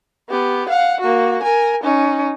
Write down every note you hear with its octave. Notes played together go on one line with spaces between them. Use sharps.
B3 G4
F5 F#5
A#3 F#4
A#4 G#5
C#4 D#4